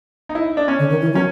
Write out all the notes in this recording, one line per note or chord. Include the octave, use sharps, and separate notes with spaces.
D#4
E4
D4
C#4
D3
D#3
E3
F#3
C#4